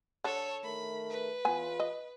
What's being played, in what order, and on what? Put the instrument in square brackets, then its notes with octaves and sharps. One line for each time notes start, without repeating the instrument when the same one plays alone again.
[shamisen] D3 D4 [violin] A4 C#5
[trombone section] D#3 A3 A#4 [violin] B5
[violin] B4
[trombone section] E2 F4 [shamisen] B3 G#5
[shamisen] D#5